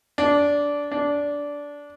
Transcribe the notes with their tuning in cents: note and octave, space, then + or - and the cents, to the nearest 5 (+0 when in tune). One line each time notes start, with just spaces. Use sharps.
D4 -15
D4 -15